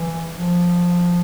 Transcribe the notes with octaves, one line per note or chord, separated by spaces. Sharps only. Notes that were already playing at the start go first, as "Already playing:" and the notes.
Already playing: E3
F3